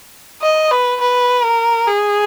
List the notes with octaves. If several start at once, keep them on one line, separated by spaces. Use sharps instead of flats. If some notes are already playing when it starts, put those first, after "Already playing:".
D#5
B4
B4
A#4
G#4